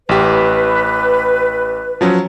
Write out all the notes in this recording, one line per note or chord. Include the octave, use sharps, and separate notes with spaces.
A1 G4 B4
F3 F#3 C#4